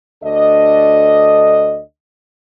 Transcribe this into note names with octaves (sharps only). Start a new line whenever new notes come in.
D2 D4 A4 D#5